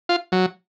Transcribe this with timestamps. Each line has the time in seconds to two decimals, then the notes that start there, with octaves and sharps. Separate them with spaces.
0.09 F4
0.32 F#3